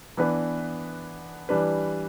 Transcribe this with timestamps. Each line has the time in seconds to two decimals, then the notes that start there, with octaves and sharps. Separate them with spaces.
0.17 E3 B3 D4 B4
1.49 E3 G3 D4 B4